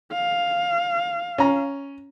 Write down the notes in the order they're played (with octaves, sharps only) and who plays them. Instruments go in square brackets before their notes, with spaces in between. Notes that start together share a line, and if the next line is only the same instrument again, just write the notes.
[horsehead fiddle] F5
[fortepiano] C#4 A#5